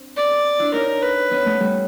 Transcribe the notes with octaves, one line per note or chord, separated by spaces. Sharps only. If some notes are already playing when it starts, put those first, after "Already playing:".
Already playing: C4 D4
D5
D4 E4
C#4 D#4 A#4
B4
B3 C#4
A3 B3
G3 A3